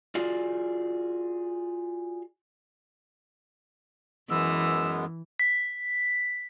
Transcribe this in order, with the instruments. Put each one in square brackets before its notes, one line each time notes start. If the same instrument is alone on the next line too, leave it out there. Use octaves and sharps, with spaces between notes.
[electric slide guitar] F4 F#4 G#4 D5
[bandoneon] F#2 G#3 B3 [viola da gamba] E3 [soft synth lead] E6
[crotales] B6